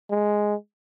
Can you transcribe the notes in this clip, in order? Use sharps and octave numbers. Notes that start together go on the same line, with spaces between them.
G#3